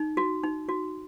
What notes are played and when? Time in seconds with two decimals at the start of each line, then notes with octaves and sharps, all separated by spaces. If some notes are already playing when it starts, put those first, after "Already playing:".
Already playing: D#4
0.17 F#4
0.44 D#4
0.69 F#4